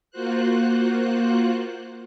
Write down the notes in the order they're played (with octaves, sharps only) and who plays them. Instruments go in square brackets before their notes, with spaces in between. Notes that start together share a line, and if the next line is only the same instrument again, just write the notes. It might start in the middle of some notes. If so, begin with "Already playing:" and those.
[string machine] A#3 F4 F#4 C5 F#6